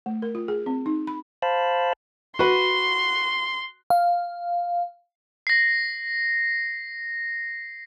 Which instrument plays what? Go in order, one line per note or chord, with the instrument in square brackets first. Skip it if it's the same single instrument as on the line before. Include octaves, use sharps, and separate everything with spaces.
[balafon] A3
A#4
F4
G#4
C4
D#4
B5
[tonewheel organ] C5 F5 A5 B5
[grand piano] F#4 B4 [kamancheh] C6
[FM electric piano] F5
[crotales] A#6 C7